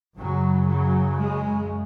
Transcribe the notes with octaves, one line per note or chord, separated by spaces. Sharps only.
F#2 C#3 F#3
F#3
G#3